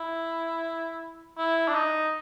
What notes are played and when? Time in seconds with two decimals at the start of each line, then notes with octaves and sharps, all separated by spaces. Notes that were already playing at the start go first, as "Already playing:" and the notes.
Already playing: E4
1.38 E4
1.68 D4
1.75 D#4